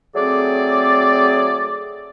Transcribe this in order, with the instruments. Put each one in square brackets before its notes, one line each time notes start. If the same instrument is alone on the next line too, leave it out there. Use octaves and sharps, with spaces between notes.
[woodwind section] F#3 A3 C4 G#4 D5